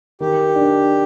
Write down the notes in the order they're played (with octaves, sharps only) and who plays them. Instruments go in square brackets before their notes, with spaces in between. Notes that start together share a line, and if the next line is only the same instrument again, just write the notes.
[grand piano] D#3 [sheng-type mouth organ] G4
[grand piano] D4